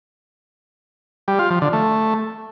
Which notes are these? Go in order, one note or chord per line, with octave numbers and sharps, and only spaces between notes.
G3
F4
F3
D3
A3